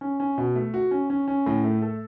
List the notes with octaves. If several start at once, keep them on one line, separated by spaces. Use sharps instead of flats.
C#4
C#4
B2
A3
F#4
C#4
C#4
C#4
A2
A3
A4